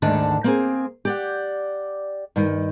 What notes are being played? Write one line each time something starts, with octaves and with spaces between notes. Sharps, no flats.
D2 G#2 D3 D#3 D4 A5
A#3 C4 G#4
G4 D5 F#5
G2 D#3